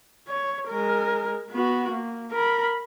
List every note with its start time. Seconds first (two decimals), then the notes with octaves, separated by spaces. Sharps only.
0.28 C#5
0.69 G#3 A#4
1.51 B3 F#4
1.91 A#3
2.31 A#4 B5